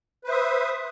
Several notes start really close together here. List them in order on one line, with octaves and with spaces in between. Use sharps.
B4 C5 E5 D#6